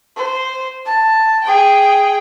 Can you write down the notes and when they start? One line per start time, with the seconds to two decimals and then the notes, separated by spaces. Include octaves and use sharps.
0.16 C5
0.85 A5
1.44 G#4 G5